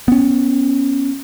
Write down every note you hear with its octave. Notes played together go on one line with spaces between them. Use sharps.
B3 C#4